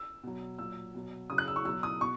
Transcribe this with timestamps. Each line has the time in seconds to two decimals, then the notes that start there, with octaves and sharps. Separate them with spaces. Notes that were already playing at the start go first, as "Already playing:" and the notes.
Already playing: E6
0.23 B2 F#3
0.58 A#2 F#3 E6
0.94 B2 F#3
1.30 C#3 F#3 D#6
1.38 F#6
1.48 E6
1.56 C#6
1.65 B2 F#3 E6
1.83 D#6
2.01 B2 C#6